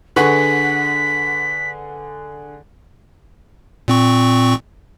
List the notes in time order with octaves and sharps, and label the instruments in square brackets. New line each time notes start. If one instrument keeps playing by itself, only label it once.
[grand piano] D3 G#4 C#6 [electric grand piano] B4 F#5 [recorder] B6
[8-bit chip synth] A#2 C4 C#6